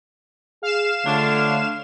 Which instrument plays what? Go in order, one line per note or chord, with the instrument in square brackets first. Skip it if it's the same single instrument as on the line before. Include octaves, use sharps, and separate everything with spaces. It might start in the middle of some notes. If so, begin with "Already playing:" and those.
[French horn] G#4 [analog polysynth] F5 E7
[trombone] D3 [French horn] A3 [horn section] D4 F4 C#5